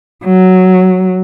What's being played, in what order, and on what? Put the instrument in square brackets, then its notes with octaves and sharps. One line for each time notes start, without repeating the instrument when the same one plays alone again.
[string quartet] F#3